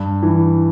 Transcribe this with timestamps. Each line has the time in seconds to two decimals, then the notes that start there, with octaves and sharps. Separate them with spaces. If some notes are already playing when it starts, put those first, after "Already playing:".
Already playing: G2
0.23 E3